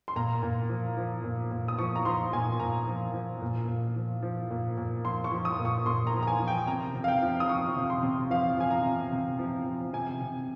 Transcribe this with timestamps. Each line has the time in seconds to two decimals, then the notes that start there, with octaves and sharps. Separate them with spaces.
0.08 C6
0.16 A#2 A#5
0.43 A#2
0.69 F3
0.97 F3
1.24 A#2
1.51 A#2
1.68 D#6
1.79 F3 C#6
1.96 A#5
2.05 F3 C6
2.33 A#2 G#5
2.60 A#2 A#5
2.87 F3
3.14 F3
3.42 A#2
3.68 A#2
3.96 F3
4.23 F3
4.51 A#2
4.78 A#2
5.05 F3 C6
5.24 C#6
5.32 F3
5.45 D#6
5.59 A#2
5.65 C#6
5.86 A#2 C6
6.07 A#5
6.14 F3
6.23 A#5
6.27 G#5
6.40 F3
6.48 G5
6.67 C3 A#5
6.94 C3
7.04 F5
7.08 G5
7.22 F3
7.40 D#6
7.49 F3 C#6
7.76 C3
7.90 C6
8.03 C3
8.30 F3 F5
8.57 F3 G#5
8.71 A#5
8.85 C3
9.12 C3
9.39 F3
9.66 F3
9.93 C3 G#5
10.21 C3